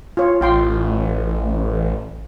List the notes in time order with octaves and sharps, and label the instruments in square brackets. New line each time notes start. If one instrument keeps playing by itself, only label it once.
[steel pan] F4 C#5
[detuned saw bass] A1 [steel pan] F4 G5 C6